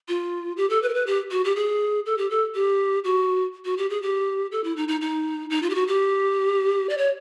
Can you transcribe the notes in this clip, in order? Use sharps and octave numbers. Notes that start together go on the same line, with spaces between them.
F4
G4
A4
B4
A#4
B4
G4
F#4
G4
G#4
A4
G4
A4
G4
F#4
F#4
G4
G#4
G4
A4
E4
D#4
D#4
D#4
D#4
F4
G4
F#4
G4
D5
C#5